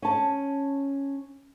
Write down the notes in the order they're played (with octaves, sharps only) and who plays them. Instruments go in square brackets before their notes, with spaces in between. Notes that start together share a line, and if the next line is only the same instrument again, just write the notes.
[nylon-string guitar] C#4 A5